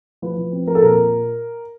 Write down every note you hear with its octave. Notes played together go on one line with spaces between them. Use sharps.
F3 B4
F3
C4
F3 A#4
A4
A#2 A#4